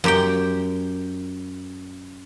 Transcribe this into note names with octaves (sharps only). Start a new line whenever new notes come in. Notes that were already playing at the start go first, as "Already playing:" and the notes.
F#2 G4 G5